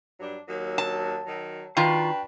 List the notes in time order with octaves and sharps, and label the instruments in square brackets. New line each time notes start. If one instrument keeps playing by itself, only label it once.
[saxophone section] G2 F#3 D4
D#2 F#3
[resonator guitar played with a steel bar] A5
[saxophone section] D#3 F#3
[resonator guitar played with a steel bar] D#3 F4 [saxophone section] D4 F#4 B4 [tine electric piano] G5